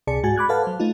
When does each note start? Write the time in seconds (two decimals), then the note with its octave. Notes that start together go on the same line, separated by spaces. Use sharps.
0.07 C#2 C3 G#4 D5 A5 C#7
0.23 G#2 G#3 F#4 G#5 A6
0.36 B5 D6 F#6 G#6
0.49 A4 B4 F5 F#5 A5
0.63 F#3 C5
0.80 A3 D#4 F4